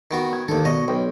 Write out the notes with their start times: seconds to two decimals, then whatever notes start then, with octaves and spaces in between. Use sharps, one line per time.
0.11 D#3 B3 F#4
0.33 G#6
0.48 D#2 D#3 A4
0.65 B2 D5 D#5 C#6
0.88 B1 C#5 G5